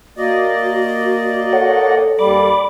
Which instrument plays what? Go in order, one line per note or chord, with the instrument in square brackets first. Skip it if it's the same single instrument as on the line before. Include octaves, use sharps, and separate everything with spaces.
[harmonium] A#3 D5 D#5 [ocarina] F#4
[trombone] A4 [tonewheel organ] C#5 F#5
[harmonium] D#2 G3 [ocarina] D5 [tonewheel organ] B5 D6